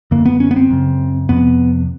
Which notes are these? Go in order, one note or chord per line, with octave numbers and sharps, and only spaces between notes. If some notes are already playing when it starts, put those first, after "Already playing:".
F#2 D3 A#3
B3
C#4
B3
C4
F#2 C#3
F2 C3 B3